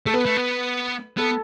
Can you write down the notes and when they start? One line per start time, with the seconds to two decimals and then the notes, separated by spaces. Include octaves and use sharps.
0.06 A3 A4
0.14 B3 B4
0.26 A3
0.37 B3
1.17 B3 A4